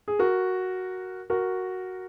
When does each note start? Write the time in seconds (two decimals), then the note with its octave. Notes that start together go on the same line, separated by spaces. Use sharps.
0.08 G#4
0.19 F#4 A#4
1.30 F#4 A#4